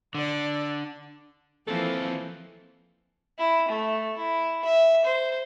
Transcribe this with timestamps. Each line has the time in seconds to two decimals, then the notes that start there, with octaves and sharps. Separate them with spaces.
0.15 D3 D5
1.67 D#2 E3 F3 A#3 C4 A4
3.38 E4
3.68 A3
4.17 E4
4.65 E5
5.05 C5